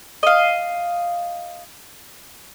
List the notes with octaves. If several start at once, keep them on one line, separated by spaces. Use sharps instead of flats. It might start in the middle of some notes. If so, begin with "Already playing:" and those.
D#5 F5